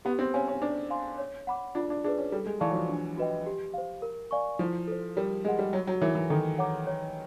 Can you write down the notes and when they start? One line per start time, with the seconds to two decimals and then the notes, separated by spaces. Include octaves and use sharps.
0.05 B3 G4
0.19 C4
0.34 C#4 C5 F5 G#5
0.48 C#4
0.62 D4 C5
0.90 F5 G#5 C6
1.18 C#5
1.47 F#5 B5 D6
1.75 D4 F4
1.90 D4
2.04 D4 G#4
2.08 B4
2.18 C#4
2.32 G3 A4
2.46 G#3
2.60 E3 D5 F5 A5 C#6
2.70 F#3
2.75 F3
2.89 D4
3.17 F#4 B4 D#5 G5
3.46 G4
3.74 C5 F5
4.02 A#4
4.31 D5 F5 G#5 C#6
4.59 F3 E4
4.87 A4 C5
5.17 G3 A#4
5.45 G#3 D#5 F#5
5.59 G3
5.73 F#3 F#4
5.87 F#3
6.01 E3 A#4 C#5 E5
6.15 E3
6.30 D#3 A4
6.58 C#5 F#5 A#5 D6
6.87 C#5